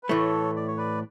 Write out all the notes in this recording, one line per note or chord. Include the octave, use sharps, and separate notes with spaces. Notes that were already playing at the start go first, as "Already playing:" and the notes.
B4
A2 E3 A3 A4 C#5
D5
C#5
B4 D5